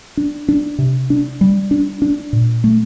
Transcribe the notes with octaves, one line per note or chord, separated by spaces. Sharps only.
D4
D4
C3
D4
G3
D4
D4
A#2
A3